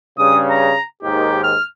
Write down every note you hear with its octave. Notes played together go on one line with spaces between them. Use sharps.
G2 C#3 D#6
A#5
D#2 G#2 D#3 G4
F6